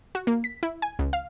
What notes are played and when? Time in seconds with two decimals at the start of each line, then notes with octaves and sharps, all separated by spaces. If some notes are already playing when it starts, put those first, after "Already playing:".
0.15 F#4
0.27 A#3
0.44 B6
0.63 E4
0.82 G#5
0.99 C#2
1.13 F5